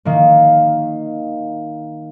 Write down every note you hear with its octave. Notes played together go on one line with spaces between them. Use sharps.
D#3 A#3